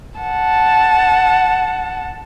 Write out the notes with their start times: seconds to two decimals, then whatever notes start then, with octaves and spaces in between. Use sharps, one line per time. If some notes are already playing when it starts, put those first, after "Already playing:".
0.20 F#5 A5